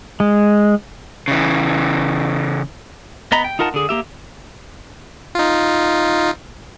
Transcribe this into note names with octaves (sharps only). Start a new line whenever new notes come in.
G#3
C#3 E3
B3 D#5 A#5 B5
G5
D#4 F4 A#4 F#5 A5
D3 G#4
A#3 G4 E5
D#4 F4